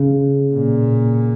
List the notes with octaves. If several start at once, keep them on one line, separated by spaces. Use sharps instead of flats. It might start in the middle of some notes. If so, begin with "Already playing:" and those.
Already playing: C#3
A#2